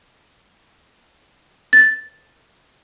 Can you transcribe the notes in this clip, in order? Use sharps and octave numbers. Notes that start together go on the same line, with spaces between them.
A6